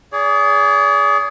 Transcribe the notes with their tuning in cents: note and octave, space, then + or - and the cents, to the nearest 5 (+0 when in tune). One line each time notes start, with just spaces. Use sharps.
G#4 +0 D5 -40